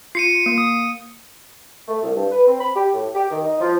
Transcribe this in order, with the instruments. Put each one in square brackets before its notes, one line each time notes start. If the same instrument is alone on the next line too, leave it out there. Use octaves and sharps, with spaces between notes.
[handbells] F4 [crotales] C7 C#7 D#7
[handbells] A#3
D#6
[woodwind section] A3
C2
G2
B4
C4
B5
G4
A2
G4
D#3
D#4
F3